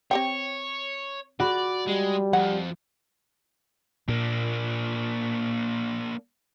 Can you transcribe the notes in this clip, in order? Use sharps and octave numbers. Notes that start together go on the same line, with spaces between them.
C4 G4 C#5 G5
F#4 D5 B5
G3 G#3
F2 F#5
A#2 A#3 D4